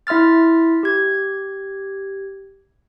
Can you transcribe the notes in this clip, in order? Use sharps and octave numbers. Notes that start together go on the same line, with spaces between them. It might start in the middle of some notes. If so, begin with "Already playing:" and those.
E4 E5 C6 F6 A6
G4 G#6